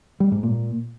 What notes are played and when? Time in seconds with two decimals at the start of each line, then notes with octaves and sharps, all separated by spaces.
0.20 G3
0.32 G#2
0.43 A#2